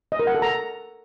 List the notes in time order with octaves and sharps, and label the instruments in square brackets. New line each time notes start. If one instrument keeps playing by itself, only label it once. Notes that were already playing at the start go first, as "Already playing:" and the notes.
[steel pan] D#5
A#4
F#5
A4
A#5